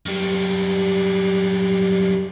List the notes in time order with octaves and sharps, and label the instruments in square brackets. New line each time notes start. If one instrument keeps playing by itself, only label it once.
[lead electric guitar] F#2 G3